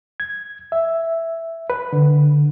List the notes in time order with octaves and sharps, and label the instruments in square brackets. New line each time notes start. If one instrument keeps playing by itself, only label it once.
[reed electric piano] G#6
E5
B4
D3